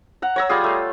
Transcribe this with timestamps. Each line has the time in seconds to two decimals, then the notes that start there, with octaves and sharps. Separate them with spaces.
0.22 F#5 A#5
0.36 C#5 A#5 E6
0.49 G3 F4 G#4
0.64 A3